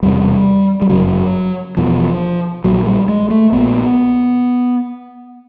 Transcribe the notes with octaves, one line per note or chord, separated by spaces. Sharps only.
E1 E2 C3 G3
G3
G1 F#2 C#3 F#3
E1 E2 B2 F3
A#1 A#2 F#3
G3
G#3
A3
A#1 A#2 B3